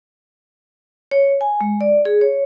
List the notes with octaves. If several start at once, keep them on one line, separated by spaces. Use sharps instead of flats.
C#5
G#5
G#3
D5
G#4
C#5